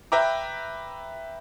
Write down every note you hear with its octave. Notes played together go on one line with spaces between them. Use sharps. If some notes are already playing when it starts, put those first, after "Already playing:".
B4 E5 G5 A#5 D6